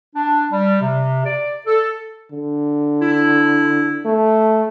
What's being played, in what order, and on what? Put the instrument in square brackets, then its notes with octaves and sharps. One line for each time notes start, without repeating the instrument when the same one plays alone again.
[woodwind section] D4
G3
C3
D5
A4
[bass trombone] D3
[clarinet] E4
[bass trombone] A3